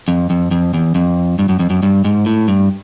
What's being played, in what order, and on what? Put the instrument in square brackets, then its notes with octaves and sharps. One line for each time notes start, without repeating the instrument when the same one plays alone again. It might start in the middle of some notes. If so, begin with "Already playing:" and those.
[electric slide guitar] F2
F2
F2
E2
F2
G2
F#2
F2
F#2
G2
G#2
A2
G2